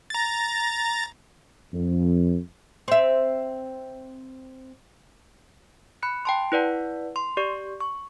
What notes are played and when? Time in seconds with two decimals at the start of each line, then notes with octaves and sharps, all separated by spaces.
0.10 A#5 A6
1.73 F2
2.88 C4 E5
6.03 B5 F#6 C#7
6.25 G5 A5 C6
6.52 E4 B4 D5 F#5
7.16 C6
7.37 G4 D5 C#6
7.81 C#6